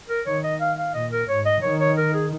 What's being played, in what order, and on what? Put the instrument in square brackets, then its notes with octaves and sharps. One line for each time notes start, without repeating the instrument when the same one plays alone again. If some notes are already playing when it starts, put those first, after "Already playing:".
[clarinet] A#4
[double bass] D#3 [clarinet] C#5
[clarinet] D#5
F5
F5
[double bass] A#2 [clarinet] D#5
[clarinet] A#4
[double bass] G#2 [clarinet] C#5
[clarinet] D#5
[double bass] D#3 [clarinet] C#5
[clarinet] C#5
A#4
G#4